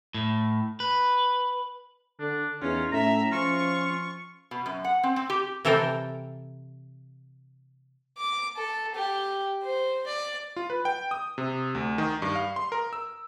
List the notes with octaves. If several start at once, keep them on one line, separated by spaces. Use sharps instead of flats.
A2
B4
D3 D4
E2 C#4 D#4 F4
A2 C#4 E5 A#5
F3 F4 C#6
B2
F#2
F#5
C4
C4
G4
C3 E3 A4 A#4 G5
D6
A4
G4
C5
D5
F4
B4
G5
D#6
C3
D2
D#3
G2
F5
C6
A#4
E6